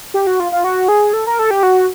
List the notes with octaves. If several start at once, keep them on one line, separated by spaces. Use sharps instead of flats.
G4
F#4
F4
F4
F#4
G#4
A4
A#4
A4
G4
F#4